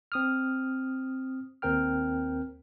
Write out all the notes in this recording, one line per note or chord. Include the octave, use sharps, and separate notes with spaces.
C4 D#6 F6
D#2 C4 A#4 G5 F6